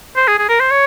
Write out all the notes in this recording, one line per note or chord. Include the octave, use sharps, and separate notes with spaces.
C5
G#4
G#4
A#4
C5
C#5